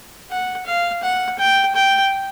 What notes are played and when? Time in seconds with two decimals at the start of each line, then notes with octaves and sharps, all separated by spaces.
0.30 F#5
0.66 F5
1.03 F#5
1.39 G5
1.75 G5